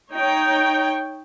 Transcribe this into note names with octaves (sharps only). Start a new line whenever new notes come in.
D#4 C#5 G5